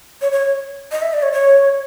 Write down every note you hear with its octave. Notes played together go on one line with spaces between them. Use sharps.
C#5
C#5
D#5
E5
D5
C#5
C#5